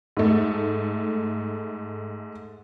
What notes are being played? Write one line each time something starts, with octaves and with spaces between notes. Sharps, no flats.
G#2 A3